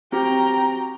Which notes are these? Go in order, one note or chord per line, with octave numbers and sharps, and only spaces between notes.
C4 F#4 G4 G5 A#5